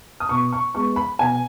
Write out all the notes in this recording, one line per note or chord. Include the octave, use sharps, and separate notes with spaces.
D#6
B2 C#6
C#6
G#3 B3 C#6
B5
B2 G#5